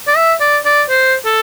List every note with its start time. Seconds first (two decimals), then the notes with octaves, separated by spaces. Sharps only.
0.08 D5
0.17 E5
0.41 D5
0.65 D5
0.89 C5
1.25 A4